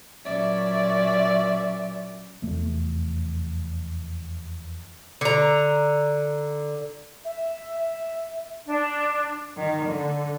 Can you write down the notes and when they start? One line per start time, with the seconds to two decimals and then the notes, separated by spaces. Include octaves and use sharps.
0.25 A#2 F#3 C#4 D5 E5
2.42 F1 E2 A3
5.21 D3 A#5
7.25 E5
8.67 D4
9.57 D#3
9.86 D3